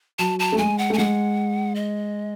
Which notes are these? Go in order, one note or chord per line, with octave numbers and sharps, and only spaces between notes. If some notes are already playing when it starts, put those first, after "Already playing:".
F#3 A5
A5
A3
G#3 G#5
F#5
A3
G#5
G#3 F#5
D#5